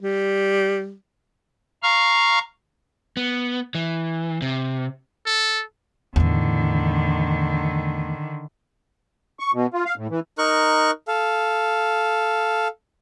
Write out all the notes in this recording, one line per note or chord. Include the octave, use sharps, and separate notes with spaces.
G3
F5 A#5 C#6 F6
B3
E3
C3
A4
E2 A2 D3 D#3
C#6
B2
F4
F5
A2
E3
D#4 A#4 C#6 F#6
A4 F5